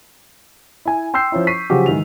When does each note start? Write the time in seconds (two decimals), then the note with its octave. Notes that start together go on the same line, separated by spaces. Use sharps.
0.85 E4 G#5
1.14 G5 C6 E6 G6 C7
1.32 F3 C#4 E4
1.47 C#6 B6 C7 D#7
1.70 C#3 F3 F#3 F#4 G4
1.86 G#2 D#3 E3 F7